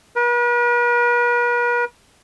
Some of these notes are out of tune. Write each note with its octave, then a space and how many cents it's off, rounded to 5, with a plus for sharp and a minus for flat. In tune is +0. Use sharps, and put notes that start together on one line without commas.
B4 -45